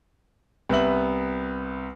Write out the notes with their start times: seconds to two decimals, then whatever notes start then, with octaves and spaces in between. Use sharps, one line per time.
0.69 C2 B3 E5 F#7